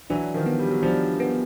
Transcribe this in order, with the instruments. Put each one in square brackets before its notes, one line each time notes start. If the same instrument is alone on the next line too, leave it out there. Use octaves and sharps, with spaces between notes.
[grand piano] E3 F#3 [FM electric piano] D4
[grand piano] D#3 F3
[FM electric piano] B3
[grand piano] G3
F#3
[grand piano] F3 G3 [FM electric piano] D4
[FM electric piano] B3